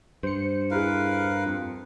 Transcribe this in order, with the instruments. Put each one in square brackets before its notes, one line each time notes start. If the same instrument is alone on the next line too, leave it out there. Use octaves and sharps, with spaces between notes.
[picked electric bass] G2 [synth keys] C5 C#7
[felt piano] E4 G#4 [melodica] A#4 B4 F5
[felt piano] F2